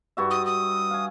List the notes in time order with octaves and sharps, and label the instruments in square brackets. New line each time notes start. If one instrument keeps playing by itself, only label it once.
[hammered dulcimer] G2 F#4 E5
[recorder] D#6
D#6
[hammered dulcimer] F5 G#5